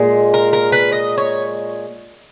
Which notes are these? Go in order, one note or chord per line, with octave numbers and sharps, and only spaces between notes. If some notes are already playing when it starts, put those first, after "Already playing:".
Already playing: A#2 G#3
A#4
A#4
B4
D#5
C#5